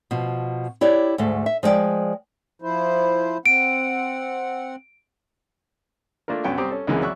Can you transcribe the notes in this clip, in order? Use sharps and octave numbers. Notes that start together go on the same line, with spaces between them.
B2 F3
E4 G4 C#5 D5
D2 G#2 A3
E5
F3 G#3 B3 D5 G5
F3 E4 C5
C4 F#5 D7
A3 A#3 D4 F4 A#4
C2 F#2 F#3 B3 C#5 G5
G3 C4 G4 A#5 D6 D#6
C#4 A4
C#2 F#2 C3 E3 G#3 A#3
F#3 D5 E5 C#6 F#6